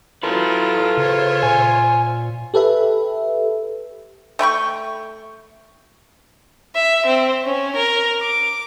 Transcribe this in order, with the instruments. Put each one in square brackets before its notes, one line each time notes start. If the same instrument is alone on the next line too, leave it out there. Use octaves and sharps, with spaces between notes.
[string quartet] F#3 E4 [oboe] F4 [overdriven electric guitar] A4 B4
[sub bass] C#3 [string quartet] C5 C#5 E5
[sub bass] A#2 [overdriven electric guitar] G#5
[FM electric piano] G4 A4 B4 E5
[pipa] A3 G5 B5 C#6
[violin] E5
C4
C#4
A#4
D6